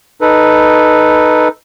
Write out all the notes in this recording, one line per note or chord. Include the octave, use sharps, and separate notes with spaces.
D#4 A4 B4